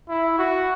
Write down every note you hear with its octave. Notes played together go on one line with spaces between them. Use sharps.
E4
F#4